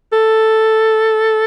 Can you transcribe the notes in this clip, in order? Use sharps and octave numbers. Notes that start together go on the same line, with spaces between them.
A4